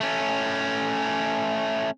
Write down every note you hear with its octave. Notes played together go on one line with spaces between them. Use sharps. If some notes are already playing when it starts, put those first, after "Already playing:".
A3 C#4